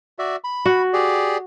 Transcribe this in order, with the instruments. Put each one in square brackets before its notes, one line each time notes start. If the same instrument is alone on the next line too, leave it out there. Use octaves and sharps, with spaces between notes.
[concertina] F#4 D5 E5
B5
[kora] F#4
[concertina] G4 G#4 D5